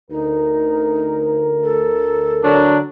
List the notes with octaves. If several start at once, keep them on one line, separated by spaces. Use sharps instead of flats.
D2 D#4 A#4
A4
D3 F#3 D4